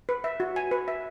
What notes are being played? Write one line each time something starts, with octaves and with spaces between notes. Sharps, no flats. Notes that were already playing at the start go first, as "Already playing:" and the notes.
B4
E5
F#4
G#5
B4
E5